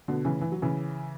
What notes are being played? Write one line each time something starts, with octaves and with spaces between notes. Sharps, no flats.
B2 D3
C#3 E3
E3
F#3
C#3 E3